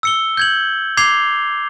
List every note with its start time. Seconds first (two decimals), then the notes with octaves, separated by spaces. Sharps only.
0.03 E6 C#7 G7
0.37 G6 G#6 F#7
0.97 D6 G#6 C7 F7 G7